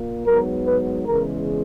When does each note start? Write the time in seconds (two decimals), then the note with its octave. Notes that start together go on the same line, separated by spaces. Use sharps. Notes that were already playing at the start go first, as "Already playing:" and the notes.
Already playing: A#2 A#3
0.27 G#2 F#3 B3 A#4
0.66 B4
1.06 E2 C#3 E3 G#3 A#4